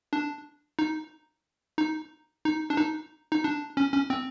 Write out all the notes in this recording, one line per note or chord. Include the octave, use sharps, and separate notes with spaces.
D4
D#4
D#4
D#4
D4
D#4
D#4
D4
C#4
C#4
C4